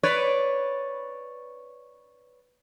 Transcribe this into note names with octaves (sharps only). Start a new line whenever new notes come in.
B4 C#5 D5